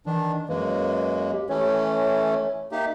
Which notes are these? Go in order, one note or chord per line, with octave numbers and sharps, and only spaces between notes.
D#3 E3 D4
F#2 G#3 A#3 B4
G4
E3 A3 C#4 C#5
A#3 D#4 G4 E5